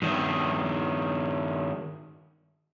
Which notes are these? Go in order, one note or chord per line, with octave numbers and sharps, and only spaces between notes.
G2 D#3